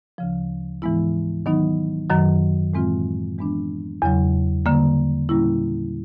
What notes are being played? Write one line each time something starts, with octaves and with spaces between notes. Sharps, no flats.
D2 C#3 F3
G#2 E3 G#3 B3 E4
D#3 F#3 B3 D#4
F#2 D#3 F#3
A2 E3 G#3 C4 F4
E3 G#3 B3 D4
E2 C#3 F#3
D3 G3 A#3
A#2 G3 A#3 C#4 E4